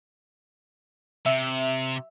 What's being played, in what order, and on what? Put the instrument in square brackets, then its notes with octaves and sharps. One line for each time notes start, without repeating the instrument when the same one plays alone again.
[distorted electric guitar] C3 [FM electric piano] E5